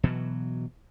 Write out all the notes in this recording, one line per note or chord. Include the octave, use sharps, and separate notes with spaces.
B2 E3 F#3